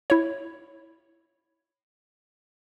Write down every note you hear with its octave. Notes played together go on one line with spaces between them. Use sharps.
E4 C#5